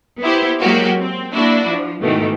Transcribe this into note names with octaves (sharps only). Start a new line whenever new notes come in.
B3 E4 G4 C5
F#3 G#3 A#3 F#4 G4
C4
A#3 D4 E4 F#4
F3
G#2 B2 D#3 E3 A3